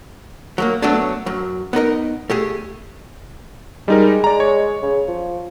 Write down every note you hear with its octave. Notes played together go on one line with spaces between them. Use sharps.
F#3 A3 A#3
F#3 A3 B3 C#4 D4
F#2 F#3
B3 D#4 A#4 D#5
A3 G4 G#4
G3 G#3 D#4 A#4
D5 A#5
C#5
C#3
F3